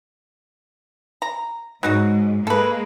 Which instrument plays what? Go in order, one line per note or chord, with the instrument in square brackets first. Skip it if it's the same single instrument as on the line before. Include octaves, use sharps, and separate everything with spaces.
[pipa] A#5
[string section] G#2 [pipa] F#3 D#4 F#4
[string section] G#3 A#3 [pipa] A4 B4